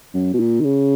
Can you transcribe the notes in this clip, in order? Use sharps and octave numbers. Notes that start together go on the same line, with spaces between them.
F#2
B2
A#2
D#3
C#3